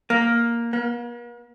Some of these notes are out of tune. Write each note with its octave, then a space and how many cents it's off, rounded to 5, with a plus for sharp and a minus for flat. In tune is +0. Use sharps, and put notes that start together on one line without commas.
A#3 +5
A#3 +45